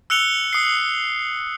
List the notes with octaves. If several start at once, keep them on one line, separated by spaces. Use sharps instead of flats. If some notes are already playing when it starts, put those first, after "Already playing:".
E6 F#6 C#7 F7 G7
D#6 C7